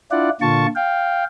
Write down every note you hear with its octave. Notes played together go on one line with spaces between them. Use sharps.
D4 E4 F4 D5 F#5
A#2 D3 F4 A5 C#6
F5 G5